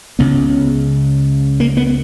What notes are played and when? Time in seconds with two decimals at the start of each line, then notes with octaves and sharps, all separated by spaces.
0.19 C#2 C#3 B3
1.60 A#3
1.77 B3